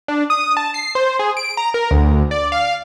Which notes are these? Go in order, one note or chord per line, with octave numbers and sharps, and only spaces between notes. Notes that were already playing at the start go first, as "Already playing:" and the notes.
D4
D#6
A5
C7
C5
G#4
D7
A#5
A#4
D2
D5
F5